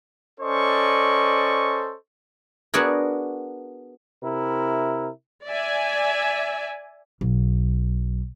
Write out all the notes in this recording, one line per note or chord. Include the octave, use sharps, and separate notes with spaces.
C#4 A4 C5 D5 D#5 C#6
B3 D4 F#4 G#4 A#4
C3 E4 A#4
D5 E5 G#5
B1